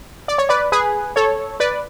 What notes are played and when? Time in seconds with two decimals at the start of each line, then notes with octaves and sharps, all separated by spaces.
0.28 D5
0.38 C#5
0.49 B4 D5
0.72 G#4 B4
1.16 A4 C#5
1.60 B4 D5